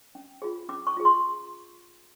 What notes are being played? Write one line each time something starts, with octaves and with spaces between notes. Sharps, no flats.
C#4
F4 G#4
C#4 D6
C#6
F4 G#4
C6